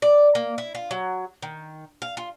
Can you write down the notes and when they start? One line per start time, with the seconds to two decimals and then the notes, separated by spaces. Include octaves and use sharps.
0.02 D5
0.35 A#3
0.58 E4
0.75 F4
0.91 F#3
1.42 D#3
2.02 F5
2.17 F4